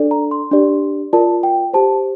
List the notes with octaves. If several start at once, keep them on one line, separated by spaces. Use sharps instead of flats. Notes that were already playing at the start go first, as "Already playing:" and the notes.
Already playing: D4 A4 D5
A#5
C6
D4 G4 D5
F4 A#4 D5 A5
G5
G4 C5 A5